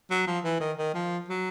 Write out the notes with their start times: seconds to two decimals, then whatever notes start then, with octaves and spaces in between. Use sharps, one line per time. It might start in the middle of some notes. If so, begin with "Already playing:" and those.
0.10 F#3
0.27 F3
0.44 E3
0.60 D#3
0.78 D#3
0.94 F3
1.28 F#3